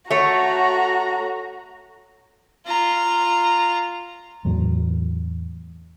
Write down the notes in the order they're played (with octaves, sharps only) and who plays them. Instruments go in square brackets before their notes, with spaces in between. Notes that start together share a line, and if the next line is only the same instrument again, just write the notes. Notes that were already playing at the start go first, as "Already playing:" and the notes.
[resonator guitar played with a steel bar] A3 C#5 [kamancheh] F#4 A#5
[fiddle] F4 A#5
[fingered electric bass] E2 A2 F#3